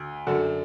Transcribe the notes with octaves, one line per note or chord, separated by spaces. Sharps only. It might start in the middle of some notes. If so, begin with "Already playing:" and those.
Already playing: D2
F#2 D3 F#4 A4